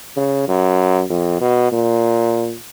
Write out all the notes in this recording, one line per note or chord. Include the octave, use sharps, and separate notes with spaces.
C#3
F#2
F2
B2
A#2